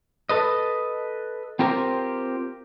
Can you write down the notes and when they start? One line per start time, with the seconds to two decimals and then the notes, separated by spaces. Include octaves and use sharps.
0.29 A4 B4 D#5
1.59 C4 F4 G4 A#4 C5